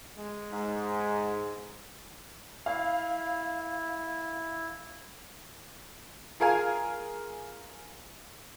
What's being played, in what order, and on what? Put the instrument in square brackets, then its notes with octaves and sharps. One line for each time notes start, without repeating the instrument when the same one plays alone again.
[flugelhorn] G#3
[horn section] G#2
[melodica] E4 [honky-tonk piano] F5
[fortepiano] F4 G#4 A#4 F5 G#5